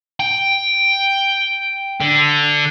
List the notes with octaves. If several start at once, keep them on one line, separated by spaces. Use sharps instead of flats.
G5
D3